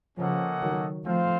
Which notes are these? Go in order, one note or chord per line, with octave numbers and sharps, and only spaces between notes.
C#3 F3 A#3 C#4 A4 D#5 F#5
D#3 F#3
F3 A3 C4 F4 C5 F5